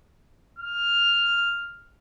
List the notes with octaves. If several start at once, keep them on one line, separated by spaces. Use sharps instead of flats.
F6